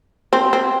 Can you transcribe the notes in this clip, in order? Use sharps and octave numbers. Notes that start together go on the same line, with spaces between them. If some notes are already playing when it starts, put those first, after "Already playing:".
C4
C4